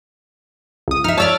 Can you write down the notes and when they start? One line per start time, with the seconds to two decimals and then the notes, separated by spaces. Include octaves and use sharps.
0.88 C#2 D#6
1.04 D#4 E5 F6
1.17 C#5 D5 A5 E6 F6